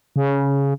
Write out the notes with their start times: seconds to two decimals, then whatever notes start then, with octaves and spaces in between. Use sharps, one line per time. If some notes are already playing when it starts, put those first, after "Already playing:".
0.16 C#3